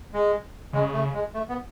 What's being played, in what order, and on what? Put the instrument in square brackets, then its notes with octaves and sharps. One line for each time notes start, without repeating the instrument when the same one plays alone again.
[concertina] G#3
[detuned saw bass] C#3 [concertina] G#3
[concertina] A3
G#3
A3
B3